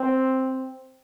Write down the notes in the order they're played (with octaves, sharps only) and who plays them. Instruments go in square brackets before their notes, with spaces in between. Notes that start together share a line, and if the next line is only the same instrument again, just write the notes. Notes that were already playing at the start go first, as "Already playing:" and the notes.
Already playing: [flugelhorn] C4